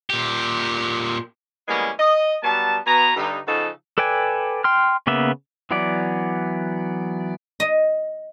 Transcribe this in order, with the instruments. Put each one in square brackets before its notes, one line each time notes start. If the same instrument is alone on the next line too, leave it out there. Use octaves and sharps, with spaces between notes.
[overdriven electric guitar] A#2 G4
[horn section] E3 G3 G#3 A#3 B3 C#4
D#5
F#3 G3 B3 A5
B2 B3 G#5 A#5
G2 D3 D#4
C#3 F3 D#4 A4 F#5
[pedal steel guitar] A4 B4 D5 G5 G#5
G5 C6 F6
C#3 A#3 B3 E5
E3 F#3 B3 D5
[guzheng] D#5